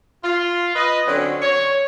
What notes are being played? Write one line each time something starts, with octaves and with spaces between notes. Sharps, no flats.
F4
B4 D#5
D3 F#3 C4 C#4
C#5